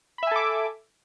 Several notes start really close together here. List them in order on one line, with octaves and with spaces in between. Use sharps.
B5 E5 G#5 A4 D6